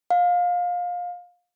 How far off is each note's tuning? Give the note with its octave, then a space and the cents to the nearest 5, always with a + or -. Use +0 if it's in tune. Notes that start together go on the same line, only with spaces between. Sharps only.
F5 +25